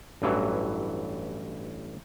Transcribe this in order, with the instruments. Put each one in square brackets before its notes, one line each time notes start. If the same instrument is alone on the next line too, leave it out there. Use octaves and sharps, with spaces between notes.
[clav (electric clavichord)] A1 G2 E3 F#3